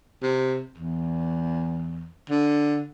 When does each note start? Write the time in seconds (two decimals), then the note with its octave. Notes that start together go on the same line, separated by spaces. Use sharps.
0.23 C3
0.78 E2
2.30 D3